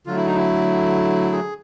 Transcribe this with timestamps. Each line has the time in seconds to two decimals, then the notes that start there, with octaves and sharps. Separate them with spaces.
0.07 D3 F#3 A3 F4
0.17 E4
0.27 D#4
0.35 E4
1.32 G#4